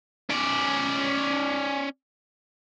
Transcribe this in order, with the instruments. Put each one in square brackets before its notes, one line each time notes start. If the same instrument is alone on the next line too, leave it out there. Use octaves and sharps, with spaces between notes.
[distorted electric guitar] C#4 D5